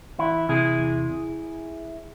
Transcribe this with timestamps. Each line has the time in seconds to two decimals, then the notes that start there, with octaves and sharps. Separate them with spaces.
0.19 E3 E4
0.49 C3 E4 G#4
0.80 E2